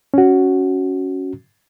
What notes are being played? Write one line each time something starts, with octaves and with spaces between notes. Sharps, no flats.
C#4 F#4